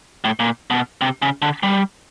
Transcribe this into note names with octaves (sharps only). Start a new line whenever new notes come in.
A2
A#2
B2
C3
C#3
D3
G3